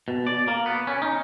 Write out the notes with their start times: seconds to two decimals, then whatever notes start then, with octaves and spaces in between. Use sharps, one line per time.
0.08 B2
0.27 D5
0.48 A#3
0.66 B3
0.87 C#4
1.02 D#4